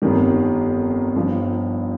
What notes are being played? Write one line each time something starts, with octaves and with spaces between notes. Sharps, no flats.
G1 F2 D#3 G3
G1 G2 F3